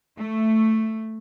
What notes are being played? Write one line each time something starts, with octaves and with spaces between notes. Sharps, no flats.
A3